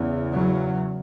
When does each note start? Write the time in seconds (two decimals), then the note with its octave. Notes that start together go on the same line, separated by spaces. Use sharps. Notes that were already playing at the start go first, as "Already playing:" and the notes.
Already playing: E2 C#3
0.34 F#3